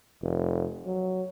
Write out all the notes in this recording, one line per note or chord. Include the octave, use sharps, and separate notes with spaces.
F1
F#3